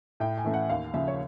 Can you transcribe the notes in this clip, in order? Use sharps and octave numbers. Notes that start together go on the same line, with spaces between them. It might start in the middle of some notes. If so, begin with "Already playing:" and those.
A2 G5
G#5
E3 A3 C#4
F#5
D#2 F5
C#3 F3 E5
C#5